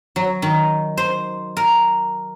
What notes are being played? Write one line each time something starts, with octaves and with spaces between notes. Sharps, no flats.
F#3
D#3
C5
A#4